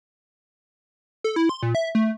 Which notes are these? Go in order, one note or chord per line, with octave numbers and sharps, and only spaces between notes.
A4
E4
C6
A#2
E5
A3